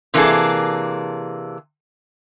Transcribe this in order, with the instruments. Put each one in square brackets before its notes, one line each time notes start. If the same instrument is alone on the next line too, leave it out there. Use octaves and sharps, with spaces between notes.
[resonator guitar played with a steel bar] C3 E3 A#3 D4 G#4 A4